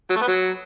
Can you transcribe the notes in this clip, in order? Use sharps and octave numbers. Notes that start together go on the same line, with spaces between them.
F#3
A3
B3
F#3